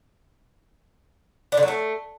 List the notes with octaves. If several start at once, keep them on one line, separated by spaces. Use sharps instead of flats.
D4
D3
F#3
A3